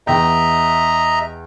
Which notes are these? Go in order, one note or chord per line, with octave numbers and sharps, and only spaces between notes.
E2 D#5 E5 G5 A#5